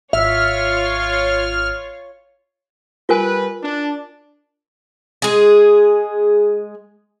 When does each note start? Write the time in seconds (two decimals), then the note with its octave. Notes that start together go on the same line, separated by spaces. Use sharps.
0.13 G#1 F4 C#5 E5 F6
3.09 G3 F4 A#4 B4 G#5
3.63 D4
5.22 G#3 G#4